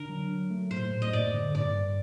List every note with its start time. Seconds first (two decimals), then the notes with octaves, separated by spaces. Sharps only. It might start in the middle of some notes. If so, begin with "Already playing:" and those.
Already playing: D3 D4 A#4
0.09 F#3
0.30 F#3
0.51 A3
0.71 A2 C5
0.92 A2
1.02 D#5
1.12 F#2 D5
1.34 D3
1.54 G2 D5
1.75 G2